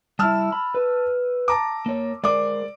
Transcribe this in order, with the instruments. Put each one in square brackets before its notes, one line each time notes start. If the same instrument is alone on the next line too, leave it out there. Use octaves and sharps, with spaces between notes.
[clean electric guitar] G3 E4 [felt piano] A5 E6 F6
[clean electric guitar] B5
B4
[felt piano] A5 A#5 D6
[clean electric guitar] A#3 C#5
[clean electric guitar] G#3 A#4 C5 [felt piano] D5 D6